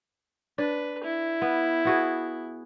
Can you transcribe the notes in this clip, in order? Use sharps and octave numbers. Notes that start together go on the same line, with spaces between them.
D4 B4
E4
B3
B3 F#4 G#4